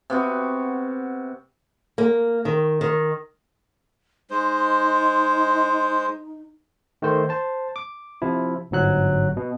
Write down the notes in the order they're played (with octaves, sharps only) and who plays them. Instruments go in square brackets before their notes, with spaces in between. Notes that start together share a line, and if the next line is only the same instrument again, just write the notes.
[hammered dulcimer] C3 B3 F#4
[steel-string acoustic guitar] A#3
D#3
D#3
[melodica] G#3 C5 [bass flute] D#4
[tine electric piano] D#3 A3 C5
C5 A5
D6
C3 F3 E4
G1 G#2 F#3 F#6
B2